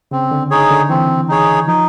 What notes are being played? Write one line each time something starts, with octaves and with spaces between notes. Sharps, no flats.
C#3 C4
D3
D#4 G#4 C#5
D3
E3 C4
D#4 G#4 C#5
F3 D#4